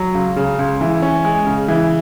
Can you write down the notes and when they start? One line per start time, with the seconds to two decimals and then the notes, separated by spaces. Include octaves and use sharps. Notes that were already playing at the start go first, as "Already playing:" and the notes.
Already playing: F#3
0.14 C#2
0.36 C#3
0.59 C#2
0.81 E3
1.02 C#4
1.24 G#3
1.46 C#3
1.68 E3